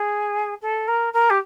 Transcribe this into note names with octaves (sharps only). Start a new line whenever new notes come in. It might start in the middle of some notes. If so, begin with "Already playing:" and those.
Already playing: G#4
A4
A#4
A#4
G4